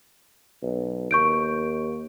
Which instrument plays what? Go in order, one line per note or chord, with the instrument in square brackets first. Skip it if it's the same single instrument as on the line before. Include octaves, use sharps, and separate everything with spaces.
[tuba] B1
[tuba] D#2 [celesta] C#6 G6 D7